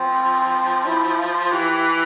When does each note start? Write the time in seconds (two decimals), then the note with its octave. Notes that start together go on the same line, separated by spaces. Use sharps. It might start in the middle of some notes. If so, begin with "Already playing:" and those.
Already playing: F3 C4
0.86 E4
1.19 F4
1.52 E3 G4